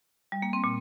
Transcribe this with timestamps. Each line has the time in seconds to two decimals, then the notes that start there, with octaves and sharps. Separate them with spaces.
0.32 G3
0.42 A#3
0.53 C4
0.64 A#2